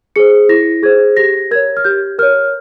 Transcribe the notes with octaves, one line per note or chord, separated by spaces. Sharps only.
G#4 C5 C#7
E4 A#6
G#4 C5 G#6
G4 A#6
A#4 C#5 G#6
F6
G4 G6
A#4 C#5 F6